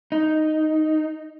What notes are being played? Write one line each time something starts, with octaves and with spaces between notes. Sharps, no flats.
D#4